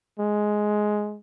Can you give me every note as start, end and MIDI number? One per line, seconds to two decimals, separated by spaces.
0.20 1.18 56